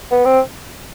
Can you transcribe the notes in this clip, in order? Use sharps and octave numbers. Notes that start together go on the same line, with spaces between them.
B3
C4